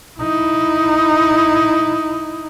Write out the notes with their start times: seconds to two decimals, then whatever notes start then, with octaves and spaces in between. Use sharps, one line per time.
0.19 D#4 E4